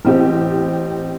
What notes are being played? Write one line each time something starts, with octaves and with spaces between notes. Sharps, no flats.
A1 C4 G4